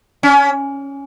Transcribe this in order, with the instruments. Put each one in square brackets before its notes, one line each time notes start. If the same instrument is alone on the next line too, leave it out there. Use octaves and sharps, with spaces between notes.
[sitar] C#4